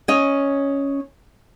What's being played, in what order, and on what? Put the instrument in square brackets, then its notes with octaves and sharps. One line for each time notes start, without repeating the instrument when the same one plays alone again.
[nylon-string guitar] C#4 C#5 D#5